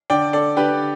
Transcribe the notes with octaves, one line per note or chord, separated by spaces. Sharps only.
D3 D5 G5
A4 D5
D3 G4 B4